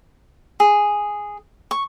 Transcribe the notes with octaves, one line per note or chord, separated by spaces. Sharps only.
G#4
C#6